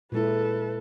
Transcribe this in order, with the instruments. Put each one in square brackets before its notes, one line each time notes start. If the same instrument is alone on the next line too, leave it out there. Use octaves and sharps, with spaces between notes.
[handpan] A#2 G#3 E4 [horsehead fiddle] A4 B4